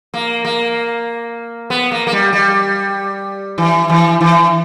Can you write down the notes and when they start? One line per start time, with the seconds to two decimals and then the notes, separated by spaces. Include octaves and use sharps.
0.14 A#3
0.45 A#3
1.70 B3
1.91 A#3
2.07 A#3
2.12 G3
2.33 G3
3.58 E3
3.90 E3
4.21 E3